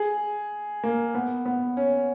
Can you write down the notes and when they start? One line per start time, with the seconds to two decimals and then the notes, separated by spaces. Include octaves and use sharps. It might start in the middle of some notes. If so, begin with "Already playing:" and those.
Already playing: G#4
0.83 A#3
1.15 B3
1.46 B3
1.77 C#4